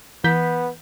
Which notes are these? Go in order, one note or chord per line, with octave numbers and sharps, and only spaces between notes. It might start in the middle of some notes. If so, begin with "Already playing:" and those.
E3 B3 G6 B6